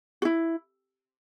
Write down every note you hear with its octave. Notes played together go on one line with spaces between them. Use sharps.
F#4
E4